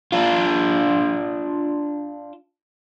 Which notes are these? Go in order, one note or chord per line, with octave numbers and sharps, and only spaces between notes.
D4 F4